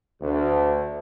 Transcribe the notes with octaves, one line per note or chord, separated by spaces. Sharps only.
D2